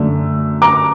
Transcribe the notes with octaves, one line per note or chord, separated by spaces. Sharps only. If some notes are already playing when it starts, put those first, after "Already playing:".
Already playing: F#2 D3 A3 D4
A#5 D6